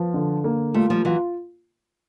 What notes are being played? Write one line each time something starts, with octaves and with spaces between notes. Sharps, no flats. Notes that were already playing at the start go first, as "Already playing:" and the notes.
Already playing: F3 B3
D3
A#3
G3 A3 F4
F3 G3
E3 F#3 F4